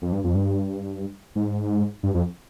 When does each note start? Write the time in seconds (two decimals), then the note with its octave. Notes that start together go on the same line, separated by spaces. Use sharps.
0.02 F2
0.12 G2
0.24 F2
0.35 G2
1.36 G#2
2.03 G2
2.14 F2